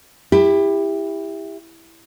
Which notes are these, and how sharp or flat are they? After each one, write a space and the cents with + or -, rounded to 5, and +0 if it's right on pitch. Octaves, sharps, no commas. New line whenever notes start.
E4 +0 G4 +25